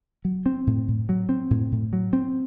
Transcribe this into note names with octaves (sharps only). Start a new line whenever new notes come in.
F#3
C4
A2
A2
F#3
C4
A2
A2
F#3
C4